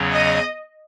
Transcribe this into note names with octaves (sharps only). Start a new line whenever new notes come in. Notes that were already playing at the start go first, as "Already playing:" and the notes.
Already playing: E2 C#3 F#3 C#4
D#5